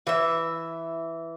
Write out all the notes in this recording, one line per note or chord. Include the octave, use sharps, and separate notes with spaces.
E3 E5